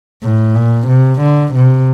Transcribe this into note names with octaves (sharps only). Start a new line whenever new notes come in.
A2
A#2
C3
D3
C3